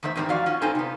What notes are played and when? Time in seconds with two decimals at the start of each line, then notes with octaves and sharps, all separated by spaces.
0.03 E2 D#3 A3 C5 E5
0.16 E2 G#2 D#3 G3 C4
0.29 F2 F#4 D5 F5
0.46 C#4 F4 F#4
0.61 G2 C4 D#4 A4 C5 G#5
0.75 C3 B3